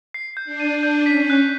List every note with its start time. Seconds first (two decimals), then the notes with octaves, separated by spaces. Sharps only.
0.14 C7
0.37 G6
0.45 D4
0.60 D#7
0.75 D4
0.83 G6
1.06 C#4 B6
1.30 F#6